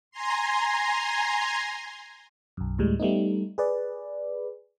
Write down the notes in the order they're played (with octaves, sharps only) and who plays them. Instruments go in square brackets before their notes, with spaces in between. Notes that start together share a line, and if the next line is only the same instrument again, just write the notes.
[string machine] G#5 A#5 C6
[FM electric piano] B1 F#2
D2 A2 G3 G#3
G3 A3 B3 D#4
G#4 B4 D5